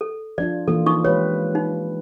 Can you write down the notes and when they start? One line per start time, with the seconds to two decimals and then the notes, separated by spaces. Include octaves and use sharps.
0.01 A4
0.38 F3 D4 F4 D5
0.68 E3 A#3 F4 A4
0.86 D#4 C#6 D#6
1.05 G#3 G4 B4 C#5
1.55 D#4